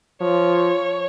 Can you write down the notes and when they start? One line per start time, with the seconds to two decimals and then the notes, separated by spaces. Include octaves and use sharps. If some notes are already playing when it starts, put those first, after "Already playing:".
0.21 F3 C#5